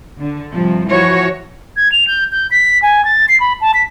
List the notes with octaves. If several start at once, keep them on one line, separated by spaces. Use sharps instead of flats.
D3
G2 C3 F3
E3 F3 F#4 C#5
G#6
F7
G6
G6
B6
G#5
A6
C7
B5
A5
B6